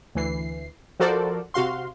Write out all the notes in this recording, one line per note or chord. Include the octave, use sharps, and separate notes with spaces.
D2 E3 C7
F3 F#4 A4 A#4 C5 D5
C3 F#4 F5 C6